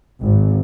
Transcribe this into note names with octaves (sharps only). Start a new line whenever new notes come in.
G#1